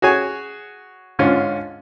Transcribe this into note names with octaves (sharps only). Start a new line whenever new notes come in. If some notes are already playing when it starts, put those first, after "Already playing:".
F#4 G#4 C#5 G#5
G#2 D3 C#4 F4